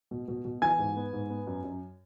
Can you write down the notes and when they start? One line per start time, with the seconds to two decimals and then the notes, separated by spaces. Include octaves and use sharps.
0.11 B2
0.28 B2
0.45 B2
0.62 E3 G#5 G#6
0.79 G#2
0.96 B3
1.13 G#2
1.30 B3
1.47 F#2
1.64 F#2